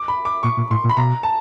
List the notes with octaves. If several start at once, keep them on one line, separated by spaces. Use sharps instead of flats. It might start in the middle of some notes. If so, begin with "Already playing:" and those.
Already playing: D6
B5
D6
A#2 C#6
A#2
A2 C6
A#2
B5
B2 A#5
A5